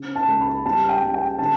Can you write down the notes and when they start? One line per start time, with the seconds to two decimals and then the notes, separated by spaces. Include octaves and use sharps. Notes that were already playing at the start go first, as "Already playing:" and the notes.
Already playing: C#3
0.16 A5
0.28 C#2
0.41 B5
0.65 G3 A5
0.89 G5
1.03 G3
1.14 G5
1.38 D3 A5